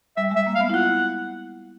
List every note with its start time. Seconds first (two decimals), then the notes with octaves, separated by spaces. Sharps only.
0.17 G3 E5
0.31 G#3 E5
0.46 A#3
0.55 F5
0.61 B3
0.69 E4
0.74 F4 F#5